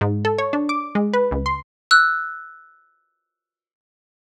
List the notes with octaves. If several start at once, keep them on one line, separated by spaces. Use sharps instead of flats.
G#2
A4
C#5
D4
D6
G#3
B4
C#2
C6
E6 F#6